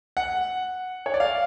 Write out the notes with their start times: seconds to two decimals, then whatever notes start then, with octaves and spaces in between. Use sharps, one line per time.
0.17 F#5
1.06 C#5
1.14 D5
1.20 F5